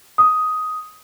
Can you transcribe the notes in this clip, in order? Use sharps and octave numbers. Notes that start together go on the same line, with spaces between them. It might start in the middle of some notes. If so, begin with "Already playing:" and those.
D#6